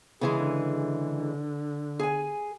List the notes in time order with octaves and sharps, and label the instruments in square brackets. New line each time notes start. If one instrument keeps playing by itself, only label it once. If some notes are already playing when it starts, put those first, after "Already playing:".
[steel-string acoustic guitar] C#3 E3 G#3 [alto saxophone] G#4
[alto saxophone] D3
[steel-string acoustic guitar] G#4 G#5